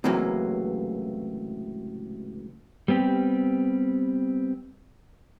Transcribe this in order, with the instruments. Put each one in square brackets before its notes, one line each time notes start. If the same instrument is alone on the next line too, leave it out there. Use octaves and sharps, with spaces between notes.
[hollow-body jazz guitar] C#2 A2 C3 E3 F#3 A#3
[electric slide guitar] G3 B3 C4 G4